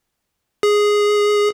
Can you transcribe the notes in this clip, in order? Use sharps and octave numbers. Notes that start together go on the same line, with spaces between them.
G#4